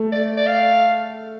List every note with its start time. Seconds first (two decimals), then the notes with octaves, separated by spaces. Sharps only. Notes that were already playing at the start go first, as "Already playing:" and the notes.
Already playing: A3
0.12 D5
0.37 D5
0.47 F5